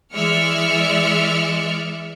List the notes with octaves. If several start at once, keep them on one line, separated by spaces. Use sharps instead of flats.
E3 G#3 D5 E5 F6 C#7